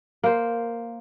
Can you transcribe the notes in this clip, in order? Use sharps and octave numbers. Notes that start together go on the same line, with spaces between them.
A#3 C5